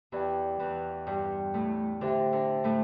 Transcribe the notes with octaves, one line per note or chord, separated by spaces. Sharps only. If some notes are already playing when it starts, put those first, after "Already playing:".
E2 E3 G4 D5 G5
E2 E3
G2 G3 G4 D5 G5
A2 A3
D3 D4 G4 C5 E5 G5
D3 D4
A2 A3